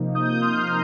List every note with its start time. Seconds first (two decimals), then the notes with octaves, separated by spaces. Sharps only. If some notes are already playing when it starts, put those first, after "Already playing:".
Already playing: C3 F3 A#3 D#4
0.15 D#6 G6
0.32 G6
0.41 C6 F6
0.68 A#5 D#6